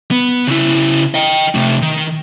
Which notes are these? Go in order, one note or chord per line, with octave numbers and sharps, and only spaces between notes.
B3
C#3 E4
D#5 G5
C3 A3
D#3